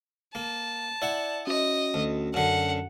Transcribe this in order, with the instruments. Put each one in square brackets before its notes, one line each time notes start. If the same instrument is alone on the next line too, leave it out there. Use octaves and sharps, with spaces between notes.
[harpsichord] A#3 [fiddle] A5
[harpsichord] E4 F#5 [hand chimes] D5
[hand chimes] C#4 F#4 [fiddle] D#5
[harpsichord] D2
[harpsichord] F#2 D3 [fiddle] F#5